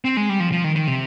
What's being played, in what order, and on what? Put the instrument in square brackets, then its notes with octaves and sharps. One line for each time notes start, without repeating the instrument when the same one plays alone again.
[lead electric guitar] C4
G#3
G3
F3
F3
D#3
D#3
C3